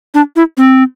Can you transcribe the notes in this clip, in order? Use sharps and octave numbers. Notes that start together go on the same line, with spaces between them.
D4
E4
C4